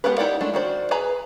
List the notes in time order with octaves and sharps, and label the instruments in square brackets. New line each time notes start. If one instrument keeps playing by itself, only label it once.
[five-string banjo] G#3 B3 G4 A#4 B4
D#4 E4 G4 D5 F#5
G#3 A3 D4
D#3 F#4 C5 D5
G#4 B4 G#5 A#5